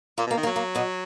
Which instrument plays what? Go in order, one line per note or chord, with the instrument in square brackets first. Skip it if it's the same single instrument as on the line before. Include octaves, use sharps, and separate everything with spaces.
[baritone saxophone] A#2 [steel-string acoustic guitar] A#3
[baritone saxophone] B2
[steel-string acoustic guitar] A#3
[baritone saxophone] D#3
[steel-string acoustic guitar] A#3
[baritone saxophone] F#3
[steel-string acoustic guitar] A#3
B2 B3